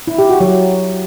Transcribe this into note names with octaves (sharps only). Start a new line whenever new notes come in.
E4
G4
F#4
F#3